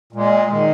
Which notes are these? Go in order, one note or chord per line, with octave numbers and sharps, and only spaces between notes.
A#2 G#3
D#3 G#3